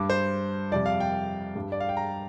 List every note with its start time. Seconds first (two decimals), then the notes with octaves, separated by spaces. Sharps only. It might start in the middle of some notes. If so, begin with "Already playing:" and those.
Already playing: G2 G3 D6
0.10 C5
0.72 F2 C3 G3 D5
0.86 F5
1.00 G5
1.56 G2 G3
1.72 D5
1.80 F5
1.89 G5
1.97 A#5